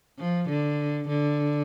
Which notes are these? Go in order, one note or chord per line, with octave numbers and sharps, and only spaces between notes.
F3
D3
D3